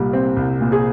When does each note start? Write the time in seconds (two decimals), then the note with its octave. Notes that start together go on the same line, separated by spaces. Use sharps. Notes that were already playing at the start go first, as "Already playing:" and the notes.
Already playing: C2 A#2 G3
0.13 C4
0.36 C2
0.61 A#2
0.72 G#4